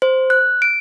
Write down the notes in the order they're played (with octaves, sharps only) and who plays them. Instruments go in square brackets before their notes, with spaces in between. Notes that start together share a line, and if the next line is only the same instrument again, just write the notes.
[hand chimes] C5
F#6
D7